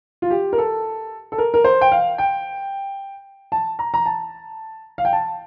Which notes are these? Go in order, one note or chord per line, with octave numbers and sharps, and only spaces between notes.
F4
G4
A#4
A4
A4
A#4
A#4
C5
G5
F5
G5
A5
A#5
A#5
A5
F5
G5
A5